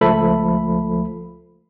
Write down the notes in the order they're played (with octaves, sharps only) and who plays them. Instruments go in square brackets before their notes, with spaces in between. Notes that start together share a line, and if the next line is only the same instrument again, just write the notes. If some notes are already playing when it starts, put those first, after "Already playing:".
[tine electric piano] C#2 F3 A3 A4 B5